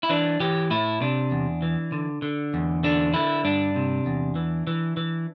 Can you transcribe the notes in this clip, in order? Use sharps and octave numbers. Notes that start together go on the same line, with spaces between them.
E4
E3 D4
E3 G4
A2 E4
C3 D4
E2
E3
D3
D3
E2
D3 D4
D3 E4
G2 D4
C3
E2
E3
E3
E3